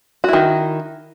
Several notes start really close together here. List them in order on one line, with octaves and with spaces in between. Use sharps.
F#4 E4 D#3